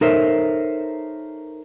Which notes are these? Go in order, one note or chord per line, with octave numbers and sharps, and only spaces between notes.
D#4 A4 A#4 C5 C#5 E5